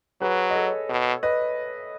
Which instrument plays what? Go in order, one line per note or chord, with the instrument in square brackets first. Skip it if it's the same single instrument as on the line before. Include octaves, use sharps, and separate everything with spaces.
[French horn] F#3 [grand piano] G#4 B4
[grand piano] D#5
A4 C#5
[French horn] B2
[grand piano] B4 D#5